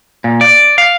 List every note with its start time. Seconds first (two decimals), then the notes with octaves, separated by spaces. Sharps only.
0.24 A#2
0.41 D5
0.78 F5